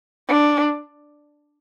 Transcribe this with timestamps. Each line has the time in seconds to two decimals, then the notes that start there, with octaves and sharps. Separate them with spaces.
0.28 D4